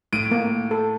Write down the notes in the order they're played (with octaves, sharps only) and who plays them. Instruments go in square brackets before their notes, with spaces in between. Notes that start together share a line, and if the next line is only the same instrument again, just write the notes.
[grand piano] A2 D7 D#7
[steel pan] A#3
A4